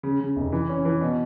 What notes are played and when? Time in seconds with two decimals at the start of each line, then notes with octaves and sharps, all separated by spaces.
0.03 C#3
0.20 C#3
0.36 F1
0.52 E3
0.69 C#4
0.85 E3
1.01 B2